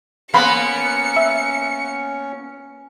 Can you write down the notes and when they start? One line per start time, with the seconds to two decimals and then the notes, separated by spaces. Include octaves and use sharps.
0.34 A#3 B3 C#4 F5 B5 C6 C#7
1.16 E5